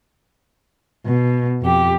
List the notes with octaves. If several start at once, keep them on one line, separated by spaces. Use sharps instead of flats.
B2
F2 G4